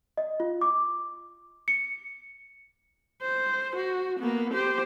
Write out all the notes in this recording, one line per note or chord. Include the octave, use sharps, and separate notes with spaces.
D#5
F4
D6
C#7
C5
F#4
A#3 B3
G4 C5